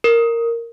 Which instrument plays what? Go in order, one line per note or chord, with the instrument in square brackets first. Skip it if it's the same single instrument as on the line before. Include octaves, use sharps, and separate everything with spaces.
[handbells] A#4